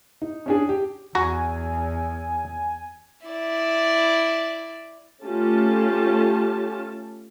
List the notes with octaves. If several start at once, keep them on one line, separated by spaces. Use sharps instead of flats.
D#4
C#4 D4 G#4
G4
E2 F#4 G#5 A#5
E4 D5
A3 C#4 F4 G4 A5